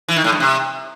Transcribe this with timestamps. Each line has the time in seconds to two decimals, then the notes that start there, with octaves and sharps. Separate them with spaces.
0.08 E3
0.16 D#3
0.24 A2
0.32 G2
0.40 C3